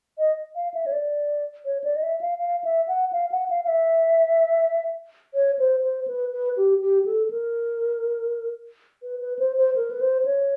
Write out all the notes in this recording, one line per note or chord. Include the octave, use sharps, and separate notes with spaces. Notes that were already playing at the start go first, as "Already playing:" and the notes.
D#5
F5
E5
C#5
D5
C#5
D5
D#5
E5
F5
F5
E5
F#5
F5
F#5
F5
F5
E5
C#5
C5
C5
B4
B4
G4
G4
A4
A#4
B4
B4
C5
C5
A#4
B4
C5
C#5